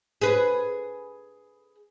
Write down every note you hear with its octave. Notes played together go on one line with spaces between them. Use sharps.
G#4 B4